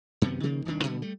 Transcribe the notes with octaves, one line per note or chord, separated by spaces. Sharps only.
F#2 C3 D#3 B3
C3 D#3 F3 A#3
D#1 C2 D#3 D4
A#2 D3 G3 B3
G3 A3